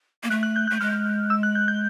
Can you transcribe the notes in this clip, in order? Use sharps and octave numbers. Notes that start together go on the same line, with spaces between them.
A#3
A3 F#6
F#6
G6
F#6
A3
G#3 F6
E6
F#6
G6
G6